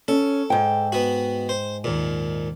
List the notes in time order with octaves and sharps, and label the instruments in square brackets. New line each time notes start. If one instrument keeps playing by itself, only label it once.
[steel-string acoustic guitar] C#4 [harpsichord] A4
[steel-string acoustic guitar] G#2 G5
[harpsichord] B3 F#4
C5
D#2 A#2